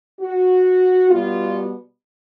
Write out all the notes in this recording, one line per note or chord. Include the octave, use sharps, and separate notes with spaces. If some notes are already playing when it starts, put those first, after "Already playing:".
F#4
B2 G3 B3 F4